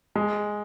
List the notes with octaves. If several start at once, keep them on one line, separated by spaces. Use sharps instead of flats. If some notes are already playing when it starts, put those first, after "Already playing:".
G#3